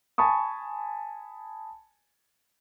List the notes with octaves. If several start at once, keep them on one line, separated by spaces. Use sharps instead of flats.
G#5 A5 B5 C#6 D#6